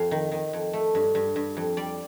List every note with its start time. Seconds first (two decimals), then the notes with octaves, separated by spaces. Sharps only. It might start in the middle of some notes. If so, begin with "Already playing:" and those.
Already playing: F2 F5
0.11 D#3
0.32 D#3
0.53 F2
0.73 A3
0.95 G2
1.15 G2
1.36 G2
1.57 F2
1.77 G3 D5